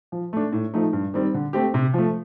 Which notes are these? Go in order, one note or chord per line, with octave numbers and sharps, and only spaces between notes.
F3
A3 D4
A2
F3 A3 D#4
G2
D#3 G3 C4
D3
A3 C4 G4
C3
F3 A3